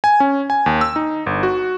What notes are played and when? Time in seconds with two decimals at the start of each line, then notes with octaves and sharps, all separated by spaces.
0.04 G#5
0.20 C#4
0.50 G#5
0.66 D#2
0.81 E6
0.96 D#4
1.26 G1
1.43 F#4